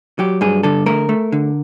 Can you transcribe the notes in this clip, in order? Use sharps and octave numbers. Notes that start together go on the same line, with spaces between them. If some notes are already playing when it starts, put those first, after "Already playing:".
F#3 G4
G2 G#4
D3 A4
A3 A#4
A3
D3